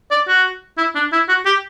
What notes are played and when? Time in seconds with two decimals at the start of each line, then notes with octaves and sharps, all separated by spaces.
0.11 D5
0.28 F#4
0.78 E4
0.95 D4
1.12 E4
1.29 F#4
1.45 G4